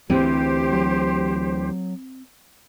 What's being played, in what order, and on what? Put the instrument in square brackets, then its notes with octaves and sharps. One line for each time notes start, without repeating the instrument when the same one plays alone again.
[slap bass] D2 E3 [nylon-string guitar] C4 [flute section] G4 C5
[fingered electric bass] F#3